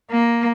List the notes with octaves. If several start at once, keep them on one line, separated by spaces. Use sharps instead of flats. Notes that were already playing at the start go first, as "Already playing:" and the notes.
A#3